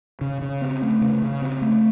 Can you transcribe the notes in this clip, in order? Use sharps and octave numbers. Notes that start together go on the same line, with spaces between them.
C#3
C#3
C4
A3
C#3
C#3
C4
A3